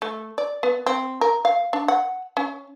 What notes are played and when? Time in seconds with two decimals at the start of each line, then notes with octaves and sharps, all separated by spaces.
0.02 A3
0.38 D5
0.63 B3
0.86 C4
1.21 A#4
1.45 F5
1.73 D4
1.88 F#5
2.37 C#4